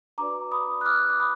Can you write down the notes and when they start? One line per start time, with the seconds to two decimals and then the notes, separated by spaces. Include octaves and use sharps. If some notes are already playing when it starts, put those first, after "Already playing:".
0.18 D4 F#4 B4 D5 A#5 D6
0.51 B5 D#6
0.81 F#6
0.86 D6 F6
1.09 D6
1.20 B5 D#6